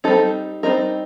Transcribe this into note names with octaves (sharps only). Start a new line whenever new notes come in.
G3 C4 D#4 A4
G3 C4 D#4 A#4